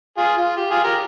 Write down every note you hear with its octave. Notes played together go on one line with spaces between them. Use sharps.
F4 G#4
F4
G4
F4 G#4
G4 A#4